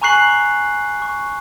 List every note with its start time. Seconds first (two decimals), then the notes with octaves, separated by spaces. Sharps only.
0.02 G#5 A#5 C#6 F#6 C7 F#7
1.02 C#6